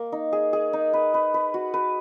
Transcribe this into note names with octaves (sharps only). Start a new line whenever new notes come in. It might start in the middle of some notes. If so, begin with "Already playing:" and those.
Already playing: A#3
D#4
G#4
G#4
D#4
B4
B4
B4
F#4
B4